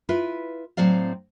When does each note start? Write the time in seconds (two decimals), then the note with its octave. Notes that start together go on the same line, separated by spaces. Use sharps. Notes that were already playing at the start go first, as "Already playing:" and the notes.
0.09 E4 F4 B4
0.77 A2 F#3 C4 D5 F5